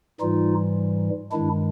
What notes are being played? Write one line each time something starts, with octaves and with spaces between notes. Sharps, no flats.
G#2 E3 G3 D#4 F4
G2 D#3 G#3 D4 E4